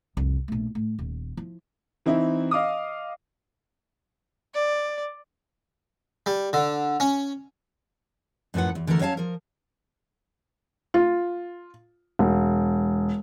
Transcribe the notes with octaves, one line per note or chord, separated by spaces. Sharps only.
C2 F2
A#1 A3
A2
D#1
F3 E4
E3 C4 D#4 E4
D#5 F5 D6 D#6
D5
G3
D3
C#4
F#2 A2 F3 B4 F#5
E2
D3 E3 A3 A4 A#4
F#3 C#4 C#5 F5 A5
F3 A#4
F4
E1